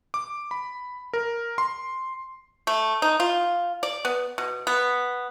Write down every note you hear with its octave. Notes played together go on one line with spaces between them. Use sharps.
D6
B5
A#4
C6
A3
D#4
F4
D5
B3
B2
B3